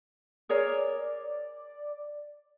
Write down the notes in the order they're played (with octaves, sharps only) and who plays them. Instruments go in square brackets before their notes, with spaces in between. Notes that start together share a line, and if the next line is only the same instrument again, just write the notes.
[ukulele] G#4 A#4 C#5 [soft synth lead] D5